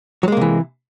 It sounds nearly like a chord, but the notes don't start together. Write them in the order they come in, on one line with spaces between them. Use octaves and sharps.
F#3 G#3 A#3 C3 E3